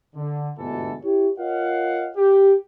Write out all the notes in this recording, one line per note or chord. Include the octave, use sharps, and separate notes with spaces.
D3
G1 D2 G#2 B2 E3 A4
E4 G4 C#5
F4 A#4 C#5 D#5 F5 F#5
G4